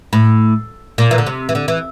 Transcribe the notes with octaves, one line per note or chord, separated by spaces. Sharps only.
A2
A#2
E3
D3
C3
E3
D3
E3